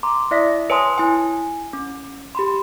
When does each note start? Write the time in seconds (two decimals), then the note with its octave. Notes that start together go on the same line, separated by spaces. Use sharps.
0.03 A#5 C6 D6
0.31 E4 D5 E5 D#6 A#6 B6
0.70 B4 C#5 G#5 A5 C6 D#6
0.98 E4 G#5
1.73 C#4
2.35 G4 B5 C6